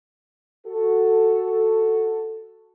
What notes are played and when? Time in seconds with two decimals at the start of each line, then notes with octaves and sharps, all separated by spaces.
0.67 F#4 A4